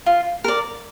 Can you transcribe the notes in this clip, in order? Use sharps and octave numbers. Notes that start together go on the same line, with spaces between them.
F4
A#4 D5